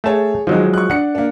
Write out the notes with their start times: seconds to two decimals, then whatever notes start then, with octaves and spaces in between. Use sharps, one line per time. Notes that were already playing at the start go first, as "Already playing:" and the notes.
0.04 A3 G#4 C#5 A5
0.47 D#3 F3 F#3 G#3 D#4
0.74 C#6 F#6
0.90 D4 F#5 C#7
1.15 A#3 D4